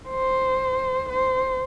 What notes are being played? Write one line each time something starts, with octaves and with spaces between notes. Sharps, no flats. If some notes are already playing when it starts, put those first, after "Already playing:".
C5
C5